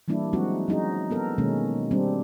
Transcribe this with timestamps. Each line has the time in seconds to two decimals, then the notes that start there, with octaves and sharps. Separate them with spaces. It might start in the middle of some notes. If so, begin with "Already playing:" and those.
0.08 E3 G3 A#3 D4 E4
0.33 F#3 G#3 C4 D#4 F#4
0.68 F#3 C#4 D#4 F#4 G#4
1.11 B3 A4 A#4
1.38 B2 D#3 G#3 A#3 C#4
1.91 G3 C4 D4